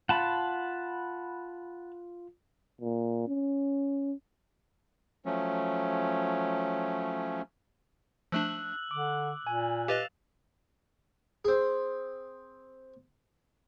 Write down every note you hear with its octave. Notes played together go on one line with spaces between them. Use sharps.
F4 F#5 A5 B5
A#2
C#4
F3 F#3 A3 C#4
F3 A3 D4 E6 F#6 F#7
D3 D6
A#2 G#5
G4 B4 D#5 F5 A6 E7 F7
C4 G#4